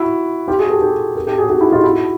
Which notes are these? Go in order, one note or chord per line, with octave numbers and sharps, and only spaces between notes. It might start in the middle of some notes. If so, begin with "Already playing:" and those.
Already playing: E4 F#4
F4 G4
F#4 G#4
G4 A4
G4 A4
G#4 A#4
G4 A4
F#4 G#4
F#4 G#4
E4 F#4
D#4 F4
E4 F#4